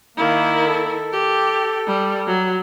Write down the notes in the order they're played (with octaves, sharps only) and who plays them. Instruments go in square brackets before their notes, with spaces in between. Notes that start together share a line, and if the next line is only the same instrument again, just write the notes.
[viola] D#3 E4 [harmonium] A#3
[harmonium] A4
[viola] G4
G3
F#3